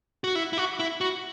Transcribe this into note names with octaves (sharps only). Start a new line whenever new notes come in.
F#4
E4
E4
F#4
E4
F#4